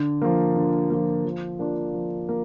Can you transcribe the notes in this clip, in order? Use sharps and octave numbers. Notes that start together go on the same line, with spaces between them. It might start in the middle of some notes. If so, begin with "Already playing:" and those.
Already playing: D3
F3 A#3
D3
F3 A#3
F3
A#3 D4 F4
F3
A#3